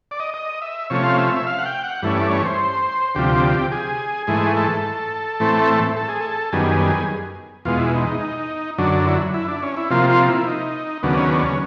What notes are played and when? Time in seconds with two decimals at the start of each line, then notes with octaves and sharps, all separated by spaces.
0.11 D5
0.20 D#5
0.34 D#5
0.62 E5
0.90 C3 F3 A3 C#4 C#5
1.04 F5
1.18 E5
1.32 E5
1.47 F5
1.59 F#5
1.66 G5
1.84 F#5
2.02 G2 E3 A3 C#4
2.16 D5
2.31 C#5
2.45 C5
3.15 D2 C3 F3 G4
3.72 G#4
4.27 G#2 E3 A3 G#4
4.56 A4
5.40 A2 E3 A3 C4
5.97 A4
6.09 G#4
6.21 A4
6.52 F#2 D#3 G3 B3 G#4
7.65 E2 B2 G#3 F4
7.79 E4
7.94 D#4
8.07 D#4
8.78 F#2 D3 F#3 D4
8.92 D4
9.07 E4
9.34 E4
9.48 D4
9.62 C#4
9.77 E4
9.90 C3 F3 A#3 F4
10.10 F4
10.29 E4
10.47 D#4
11.03 D#2 C#3 F#3 B3 D4
11.17 C#4
11.31 D4
11.46 C#4